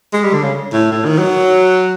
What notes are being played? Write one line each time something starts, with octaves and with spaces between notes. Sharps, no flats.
G#3
G3
D3
C#3
A2
A2
D#3
F#3